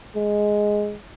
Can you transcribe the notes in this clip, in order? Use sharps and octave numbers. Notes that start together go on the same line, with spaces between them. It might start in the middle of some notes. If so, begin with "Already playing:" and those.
G#3